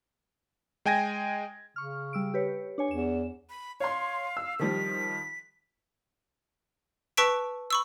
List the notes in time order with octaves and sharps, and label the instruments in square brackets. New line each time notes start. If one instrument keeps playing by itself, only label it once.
[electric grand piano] G#3 G5 G#5 G#6 A#6
[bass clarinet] C#3 [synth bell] C#6 F6
[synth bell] G3 E6 D7
G4 B4 C#5
D4 C#5 G#5
[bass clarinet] E2 [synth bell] E7
[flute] B5
[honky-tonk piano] C#5 C6 [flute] F5
[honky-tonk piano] E6
[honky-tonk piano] D#3 F3 G3 [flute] B6
[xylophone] B4 A5 C#6 E6 B6 D7
B5 C#6 E6